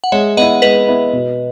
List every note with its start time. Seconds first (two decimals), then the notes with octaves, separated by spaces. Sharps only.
0.04 F#5
0.12 G#3 C#5 E5
0.37 B3 E4 D#5 F#5
0.62 G#3 B4 D#5
0.87 B3 E4
1.13 B2